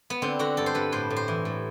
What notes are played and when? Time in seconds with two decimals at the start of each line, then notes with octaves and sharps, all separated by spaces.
0.10 B3
0.22 D3 C4
0.39 D3 F#4
0.57 G2 A4
0.66 C5
0.74 G2 B4
0.92 A2 C5
1.10 A2
1.16 C5
1.28 E3
1.45 A2